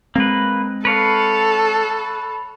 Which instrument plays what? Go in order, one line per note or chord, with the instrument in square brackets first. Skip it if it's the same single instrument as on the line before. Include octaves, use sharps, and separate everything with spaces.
[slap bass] G#3 C4 [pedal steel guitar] A#3 B4
[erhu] A4 [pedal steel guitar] B4 C#5 F5